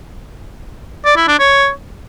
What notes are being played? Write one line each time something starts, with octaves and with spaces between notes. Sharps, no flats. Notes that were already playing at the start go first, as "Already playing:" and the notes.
D5
E4
D4
C#5